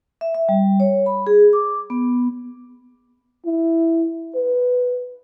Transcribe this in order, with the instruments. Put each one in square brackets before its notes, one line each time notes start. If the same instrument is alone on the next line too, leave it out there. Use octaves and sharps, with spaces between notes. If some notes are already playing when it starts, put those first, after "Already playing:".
[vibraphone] E5
E5
G3
C#5
B5
G#4
D6
B3
[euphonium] E4
B4